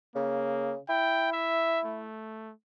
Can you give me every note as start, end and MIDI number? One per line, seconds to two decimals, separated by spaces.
0.16 0.78 49
0.16 0.74 58
0.89 2.07 64
0.89 1.29 79
1.33 1.80 76
1.85 2.53 57